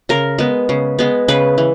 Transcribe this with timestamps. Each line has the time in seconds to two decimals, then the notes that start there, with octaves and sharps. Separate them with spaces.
0.09 C#3 A#4
0.38 G#3 B3
0.69 C#3
0.99 G#3 B3
1.28 C#3 B4
1.58 E3